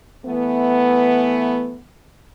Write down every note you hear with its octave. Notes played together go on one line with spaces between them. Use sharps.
E3 A3 B3